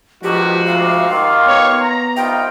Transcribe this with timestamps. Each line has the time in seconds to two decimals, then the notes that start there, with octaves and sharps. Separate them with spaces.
0.23 B2 D3 D#3 F3 G#3 F#4 G4
0.66 D2 C3 F5
1.10 D#3 F4 G4
1.47 B3 C#5
1.81 A#5
2.17 C2 D#4 F4 G5